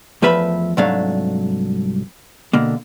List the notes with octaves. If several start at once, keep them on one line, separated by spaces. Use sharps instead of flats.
E2 F3 A3 B4 E5 B5
C2 G#2 F#3 A3 D4 F5
B2 D3 A#3